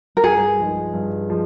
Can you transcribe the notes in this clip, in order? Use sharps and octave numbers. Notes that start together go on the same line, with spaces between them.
A#4
G2 G#4
F3 G#3 D#4
G2
F3 G#3